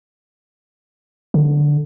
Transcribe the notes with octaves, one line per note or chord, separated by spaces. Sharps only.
D3